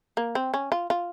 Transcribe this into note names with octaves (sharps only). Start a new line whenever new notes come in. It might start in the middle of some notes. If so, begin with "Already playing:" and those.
A#3
C4
C#4
F4
F4